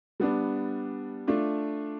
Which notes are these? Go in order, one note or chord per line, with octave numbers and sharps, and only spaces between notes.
G3 B3 D4
A3 D4 F4